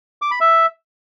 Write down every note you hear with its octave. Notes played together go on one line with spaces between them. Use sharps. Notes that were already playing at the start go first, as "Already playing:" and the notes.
D6
B5
E5